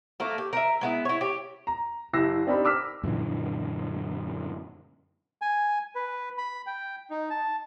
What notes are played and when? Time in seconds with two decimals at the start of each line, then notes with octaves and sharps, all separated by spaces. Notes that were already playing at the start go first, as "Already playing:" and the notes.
0.20 A3 A#3 A4
0.38 G4
0.53 A#4 E5
0.81 G#3 B3 E4
1.05 E4 C#5
1.21 G4 C#5
1.67 A#5
2.13 F#1 E4 G4 E6 A#6 C7
2.47 C4 D4 D#4 G4 A#4 B5
2.65 D6 E6 F6 B6
3.03 F#2 A#2 D3 E3
5.42 G#5
5.95 B4
6.38 B5
6.67 G5
7.10 D#4
7.30 A5